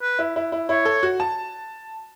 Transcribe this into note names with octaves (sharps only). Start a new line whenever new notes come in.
B4
E4
E4
E4
E4 C#5
A4
F#4
A5